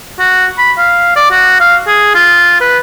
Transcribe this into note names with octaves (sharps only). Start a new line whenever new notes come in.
F#4
B5
F5
D5
F#4
F5
G#4
F4
B4